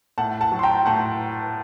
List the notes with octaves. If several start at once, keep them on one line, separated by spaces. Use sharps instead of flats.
A2 F#5 A5
F#5 A5
F#3
C6
G5 A#5
A2 F#5 A5